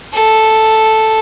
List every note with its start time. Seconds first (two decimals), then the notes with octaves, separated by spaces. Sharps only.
0.14 A4